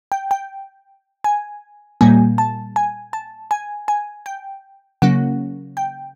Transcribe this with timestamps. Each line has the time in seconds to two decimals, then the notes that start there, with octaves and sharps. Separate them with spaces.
0.12 G5
0.31 G5
1.24 G#5
2.01 A#2 G3 A#3 G#5
2.38 A5
2.76 G#5
3.13 A5
3.51 G#5
3.88 G#5
4.26 G5
5.02 C#3 F#3 A#3 C#4 F#5
5.77 G5